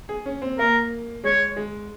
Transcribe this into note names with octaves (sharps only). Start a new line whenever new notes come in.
G#4
C#4
C4
A#3 A#4
G#3 C#5
G#3